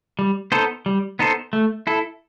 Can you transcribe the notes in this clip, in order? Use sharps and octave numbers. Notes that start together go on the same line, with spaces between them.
G3
B3 D#4 A4 C5
G3
B3 D#4 A4 C5
A3
E4 A4